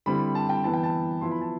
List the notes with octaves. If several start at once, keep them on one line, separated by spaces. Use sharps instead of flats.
D3 G3 C4 E4 B5
A5
G5
E3 B3 E4 A5
G5
A5
F3 B3 E4 C6
B5
A5